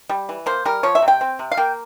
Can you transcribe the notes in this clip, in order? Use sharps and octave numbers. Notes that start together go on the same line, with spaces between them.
G3
E3
A#3 C5
G3 A#4
F3 C#5
E5
C3
G5
C4
C3
F5
A#3 G5